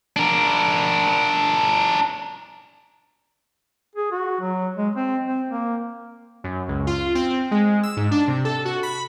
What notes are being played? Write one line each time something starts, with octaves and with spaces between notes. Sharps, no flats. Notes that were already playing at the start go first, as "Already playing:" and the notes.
D4 A#4
G#4
F#4
F#3
G#3
C4
C4
A#3
F#2
C#2
F4
C4
G#3
E6
G#2
D4
C3
A4
F#4
B5